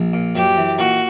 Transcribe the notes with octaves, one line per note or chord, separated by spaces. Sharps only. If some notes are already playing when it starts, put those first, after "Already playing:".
Already playing: A#1
A#2
F#2 G4
E3
A#2 F#4